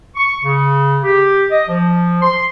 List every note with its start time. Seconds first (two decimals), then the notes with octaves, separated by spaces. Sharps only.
0.16 C#6
0.43 C#3
1.03 G4
1.51 D#5
1.68 F3
2.22 C6